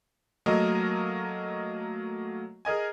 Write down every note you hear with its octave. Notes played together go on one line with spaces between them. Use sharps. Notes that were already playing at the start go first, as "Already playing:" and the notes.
F#3 A3 A#3 A#4 D#5 D#6
G#4 A#4 D#5 G#5